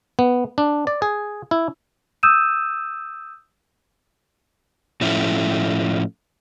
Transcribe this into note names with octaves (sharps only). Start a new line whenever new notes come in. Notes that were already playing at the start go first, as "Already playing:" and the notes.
B3
D4
D5
G#4
E4
D#6 E6 G6 D#7 E7
A2 F3 A3 C#4 E4